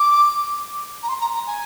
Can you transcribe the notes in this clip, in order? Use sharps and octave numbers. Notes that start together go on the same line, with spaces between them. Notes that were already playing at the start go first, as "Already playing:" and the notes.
Already playing: D6
A#5
C6
A#5
A#5
G#5